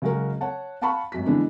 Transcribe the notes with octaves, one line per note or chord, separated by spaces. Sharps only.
C#3 F#3 G#3 F#4 A#4
C#5 F#5 A5
F5 F#5 A5 B5 C#6
G#1 F#2 B6
D3 E3 G#3 B3 D4